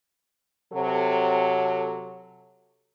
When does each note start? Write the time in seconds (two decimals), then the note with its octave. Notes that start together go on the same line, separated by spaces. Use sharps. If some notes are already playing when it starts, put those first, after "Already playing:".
0.73 C3 F#3 A4